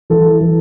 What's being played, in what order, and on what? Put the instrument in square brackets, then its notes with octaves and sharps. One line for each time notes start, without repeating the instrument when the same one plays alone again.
[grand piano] E3 A4
E3